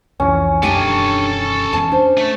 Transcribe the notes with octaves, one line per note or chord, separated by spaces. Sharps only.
C2 F2 E3 C#4
E1 F#2 D#3 D4 G4 A4 G5 G#5
E2 A5
D4 C5
A3